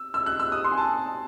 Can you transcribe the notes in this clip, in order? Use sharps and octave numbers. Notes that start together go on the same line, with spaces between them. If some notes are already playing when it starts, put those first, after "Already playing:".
Already playing: E6
E6
F#6
E6
D#6
C6
G#5
A5